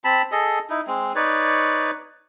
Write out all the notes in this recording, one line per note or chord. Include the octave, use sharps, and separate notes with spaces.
C4 A5 B5
G#4 A4 D#5
D#4 E4
G#3 C4
D#4 B4 C#5 D5